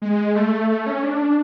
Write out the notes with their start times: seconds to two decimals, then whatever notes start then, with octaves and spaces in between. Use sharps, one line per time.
0.02 G#3
0.35 A3
0.69 A3
0.86 C#4
1.03 D4